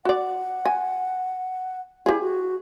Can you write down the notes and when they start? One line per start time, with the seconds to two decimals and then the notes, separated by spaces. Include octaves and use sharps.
0.05 F#4 D5 F#5
0.65 G#5
2.06 E4 G4 G#4
2.21 F#4